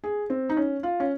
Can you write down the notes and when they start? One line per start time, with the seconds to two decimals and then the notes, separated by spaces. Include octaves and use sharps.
0.04 G#4
0.30 C4
0.49 D#4
0.57 C#4
0.83 F4
1.00 C#4